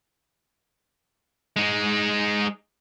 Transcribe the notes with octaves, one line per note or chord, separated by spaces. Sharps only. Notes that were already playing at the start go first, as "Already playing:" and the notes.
G#3 D#4